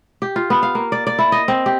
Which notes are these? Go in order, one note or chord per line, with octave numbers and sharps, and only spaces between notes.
G4
F4
B3
F5
A#3
D5
D5
E4
D#5
C4
G4